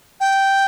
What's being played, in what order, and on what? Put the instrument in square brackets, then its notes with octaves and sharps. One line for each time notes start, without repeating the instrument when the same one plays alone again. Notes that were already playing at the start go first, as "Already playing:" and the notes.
[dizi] G5